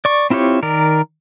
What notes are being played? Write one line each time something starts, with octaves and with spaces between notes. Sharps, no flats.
D5 C#6
C4 E4 F4 G4 C#5
D#3 A#4 D5